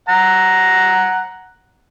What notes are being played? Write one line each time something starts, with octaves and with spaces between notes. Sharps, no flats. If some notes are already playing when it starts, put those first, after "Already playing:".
F#5 A#5